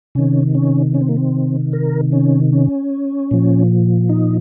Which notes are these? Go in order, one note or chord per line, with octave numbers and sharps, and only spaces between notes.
C3 D#3 C#4
C#4
C#4
C4
A#3
C4
A#4
C#4
C#4
A#2 F3
D#4